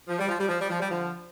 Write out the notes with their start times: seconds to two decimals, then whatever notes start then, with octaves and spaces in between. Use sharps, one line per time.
0.08 F3
0.18 G3
0.28 F3
0.39 G3
0.49 F3
0.59 G3
0.70 F3
0.80 G3
0.90 D3 F3